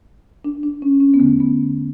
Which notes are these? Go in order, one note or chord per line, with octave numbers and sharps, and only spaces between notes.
D4
D4
C#4
C#4
B3
E2 D3 A3
B3